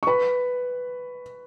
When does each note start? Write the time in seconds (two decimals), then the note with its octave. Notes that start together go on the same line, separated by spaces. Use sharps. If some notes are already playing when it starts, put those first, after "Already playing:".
0.03 C#6
0.07 B4 B5